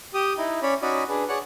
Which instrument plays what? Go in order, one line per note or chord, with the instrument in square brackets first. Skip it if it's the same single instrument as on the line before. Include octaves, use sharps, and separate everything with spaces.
[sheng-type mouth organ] G4 D#6
D#4 E4
C#4 C#5 D5 B5
C#4 D#4 F#4 D5 D#5 B5
D4 G#4 B4
G#4 C#5 D5 F#5 F#6